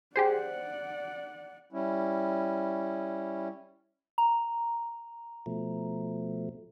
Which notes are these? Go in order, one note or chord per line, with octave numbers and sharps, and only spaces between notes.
G4 G#4 C5 D5 F#5
G3 C#4 E4
A#5
B2 F3 A3